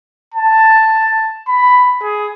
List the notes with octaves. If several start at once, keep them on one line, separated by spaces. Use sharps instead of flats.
A5
B5
G#4